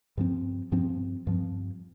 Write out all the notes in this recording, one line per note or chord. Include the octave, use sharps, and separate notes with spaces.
G2 F3 C4
G2 F3 C4
G2 F3 C4